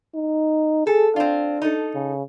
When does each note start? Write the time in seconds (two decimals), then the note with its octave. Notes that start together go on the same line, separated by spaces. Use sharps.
0.15 D#4
0.87 G#4 A4
1.16 C4 D4 F4
1.62 D#4 A4
1.95 C#3